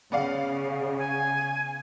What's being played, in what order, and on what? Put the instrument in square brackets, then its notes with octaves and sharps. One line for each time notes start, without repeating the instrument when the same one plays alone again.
[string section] C#3 [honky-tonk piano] B3 D5 F5
[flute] G#5